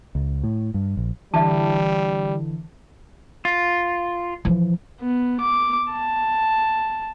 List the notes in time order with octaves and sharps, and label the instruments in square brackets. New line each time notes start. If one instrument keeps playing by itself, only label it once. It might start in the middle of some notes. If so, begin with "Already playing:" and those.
[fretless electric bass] C#2
A2
G2
A#1
[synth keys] D3 E3 [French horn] G3 [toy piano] E5 A5
[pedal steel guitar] F4
[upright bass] E3 F3
[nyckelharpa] B3
D6
A5